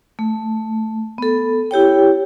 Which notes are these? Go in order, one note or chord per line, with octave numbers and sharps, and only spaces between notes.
A3
B3 A4
E4 G4 C#5 G5